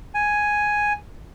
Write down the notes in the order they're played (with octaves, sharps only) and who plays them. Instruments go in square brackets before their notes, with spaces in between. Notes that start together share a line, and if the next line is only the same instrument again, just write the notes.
[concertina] G#5